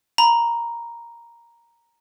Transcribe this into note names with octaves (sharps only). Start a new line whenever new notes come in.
A#5 B5